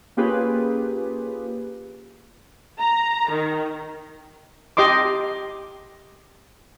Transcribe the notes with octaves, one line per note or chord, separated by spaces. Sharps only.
A#3 C#4 F4 G4 G#4 B4
A#5
D#3
G4 D#5 C6 D6